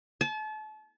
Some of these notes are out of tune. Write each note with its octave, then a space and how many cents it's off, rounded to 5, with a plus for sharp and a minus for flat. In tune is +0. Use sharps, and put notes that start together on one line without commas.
A5 -35